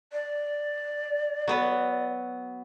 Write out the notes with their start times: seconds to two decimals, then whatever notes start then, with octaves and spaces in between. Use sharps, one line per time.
0.12 D5
1.48 F#3 B3 B4